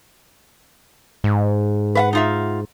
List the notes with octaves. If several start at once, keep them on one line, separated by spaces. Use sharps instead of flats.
G#2
B4 E5 F#5
D#4 F4 E5